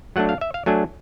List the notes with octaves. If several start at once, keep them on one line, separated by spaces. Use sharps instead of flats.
F#3 A3 D4 F#5
F5
E5
F5
F#3 A3 D4 G#5